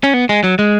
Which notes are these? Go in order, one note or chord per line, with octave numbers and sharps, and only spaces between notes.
C#4
B3
G#3
F#3
G#3